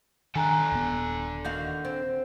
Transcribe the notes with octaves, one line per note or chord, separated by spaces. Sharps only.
D#3 D4 A4 G5 G#5 A#5 F#6
D#1 B3
D#3 F#4 F5 G6
C4